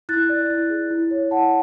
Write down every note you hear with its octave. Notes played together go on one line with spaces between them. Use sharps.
E4 F#6 A6
D5
E4
G#4
E4
C#5
E4 F#5 A5